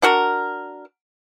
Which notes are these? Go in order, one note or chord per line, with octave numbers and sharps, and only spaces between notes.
D4 F#4 A#4